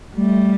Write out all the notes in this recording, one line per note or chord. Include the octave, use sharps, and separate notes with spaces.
G3 A3